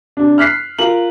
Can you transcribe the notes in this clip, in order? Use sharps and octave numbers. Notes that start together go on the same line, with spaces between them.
C3 D4
F6 F#6 B6 C7
F4 A#4 F#7